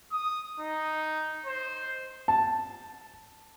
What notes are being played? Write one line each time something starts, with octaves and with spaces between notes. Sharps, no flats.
D#6
D#4
C5
A5